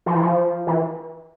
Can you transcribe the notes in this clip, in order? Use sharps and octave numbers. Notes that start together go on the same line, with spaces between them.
F3
E3
F3
E3